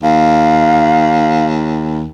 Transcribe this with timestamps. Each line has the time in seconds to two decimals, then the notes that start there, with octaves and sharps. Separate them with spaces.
0.03 D#2 F5